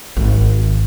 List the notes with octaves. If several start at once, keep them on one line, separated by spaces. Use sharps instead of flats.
G#1